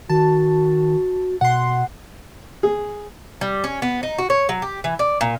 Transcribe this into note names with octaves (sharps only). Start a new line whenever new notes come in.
D#3 F#4 A5
B2 F#5 C6
G#4
G3
C#4
B3
D#4
F#4
C#5
F#3
G4
E3
D5
A#2